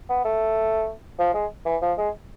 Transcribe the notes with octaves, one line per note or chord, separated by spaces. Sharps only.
B3
A3
F3
G#3
E3
F3
G#3